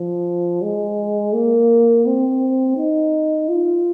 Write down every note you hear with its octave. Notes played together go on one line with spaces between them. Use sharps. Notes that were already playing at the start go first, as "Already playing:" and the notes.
Already playing: F3
G#3
A#3
C4
D#4
F4